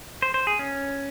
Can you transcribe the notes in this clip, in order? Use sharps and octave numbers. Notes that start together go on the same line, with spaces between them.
C5
C5
G#4
C#4